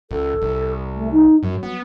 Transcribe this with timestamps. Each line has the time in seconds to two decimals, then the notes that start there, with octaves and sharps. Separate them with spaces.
0.11 C#2 A4
0.42 C2
0.96 A3
1.11 D#4
1.43 F#2 F#3
1.63 B3